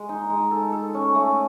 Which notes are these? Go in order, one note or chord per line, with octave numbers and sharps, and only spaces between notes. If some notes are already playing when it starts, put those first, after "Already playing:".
Already playing: G#3
D#4
G#3
A4
A4
C#4
A3